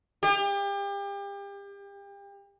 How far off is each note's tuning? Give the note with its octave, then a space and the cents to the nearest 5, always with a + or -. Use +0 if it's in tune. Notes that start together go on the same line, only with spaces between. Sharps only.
G4 +35